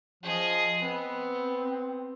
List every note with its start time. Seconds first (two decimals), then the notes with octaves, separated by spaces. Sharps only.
0.23 F3 G#4 D#5
0.82 B3 C4